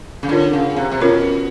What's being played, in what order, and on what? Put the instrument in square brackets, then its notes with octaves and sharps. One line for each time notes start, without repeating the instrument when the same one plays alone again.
[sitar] C#3
[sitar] D3 [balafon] C#4 F4 A#4 C#5
[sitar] C#3
C3
C3
[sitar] B2 [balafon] C#4 F4 A#4 C#5